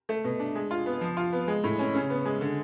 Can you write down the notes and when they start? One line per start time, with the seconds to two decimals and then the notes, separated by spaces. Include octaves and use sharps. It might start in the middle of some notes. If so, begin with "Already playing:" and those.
0.09 A3
0.24 B2
0.40 D4
0.55 G#3
0.71 F4
0.86 B3
1.01 F3
1.17 F4
1.32 B3
1.48 G#3
1.64 A2
1.79 C#4
1.94 C#3
2.10 B3
2.25 G#3
2.41 D3